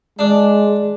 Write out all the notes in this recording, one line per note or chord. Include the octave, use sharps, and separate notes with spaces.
G#3 D4